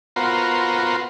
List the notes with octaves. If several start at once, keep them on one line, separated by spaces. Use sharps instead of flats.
B3 F4 F#4 A#4 C5